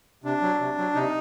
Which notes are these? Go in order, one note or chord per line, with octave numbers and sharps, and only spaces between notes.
C3 D4
F#3
C3
F#3
C3 D#4